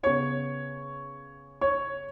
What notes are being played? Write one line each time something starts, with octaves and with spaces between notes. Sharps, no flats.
C#3 B3 C#5 C#6
C#5 C#6